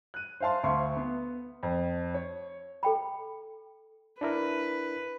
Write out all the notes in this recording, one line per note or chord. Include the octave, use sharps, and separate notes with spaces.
F#6 D#7
C5 E5 F5 A5 C6
D2 E5 F5 C6 C#6
B3
F2
C#5
A4 G5 B5
D4 E4 A#4 B4